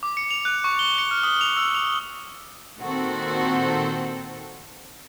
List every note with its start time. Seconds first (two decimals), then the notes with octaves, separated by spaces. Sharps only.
0.03 D6
0.17 C#7
0.31 F7
0.45 F#6
0.64 C#6
0.79 G7
0.98 C#7
1.11 F6
1.23 D#6
1.41 F7
1.57 E6
1.75 F7
2.81 A#2 D#3 C4 F#4 A4